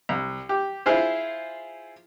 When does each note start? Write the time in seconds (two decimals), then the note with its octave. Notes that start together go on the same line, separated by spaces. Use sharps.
0.09 C2
0.49 G4
0.86 E4 F4 G#4 C5